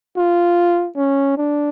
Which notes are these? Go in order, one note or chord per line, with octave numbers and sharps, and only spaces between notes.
F4
C#4
D4